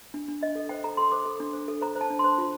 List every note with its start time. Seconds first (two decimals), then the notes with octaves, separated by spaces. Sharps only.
0.14 D4
0.28 D4
0.41 D4 D#5
0.55 A4
0.69 C5 G5
0.84 A4 A#5
0.97 A4 C6
1.11 C5 D6
1.25 A4
1.40 D4
1.53 C5
1.68 A4
1.81 C5 A#5
1.95 C5
2.01 A5
2.10 D4
2.19 C6
2.24 C5
2.38 F4